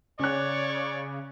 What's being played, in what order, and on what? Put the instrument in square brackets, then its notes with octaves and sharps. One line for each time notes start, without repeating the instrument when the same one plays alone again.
[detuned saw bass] C#3 [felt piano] C#4 F#6 [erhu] C#5 [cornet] D5